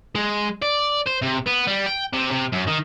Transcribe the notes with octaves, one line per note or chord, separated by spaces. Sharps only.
G#3
D5
C5
C3
B3
G3
G5
C3
C3
F#2
D#3